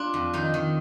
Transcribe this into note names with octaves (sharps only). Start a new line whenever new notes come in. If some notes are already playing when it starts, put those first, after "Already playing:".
Already playing: D4 F4
F2
D#3 D#4
D#3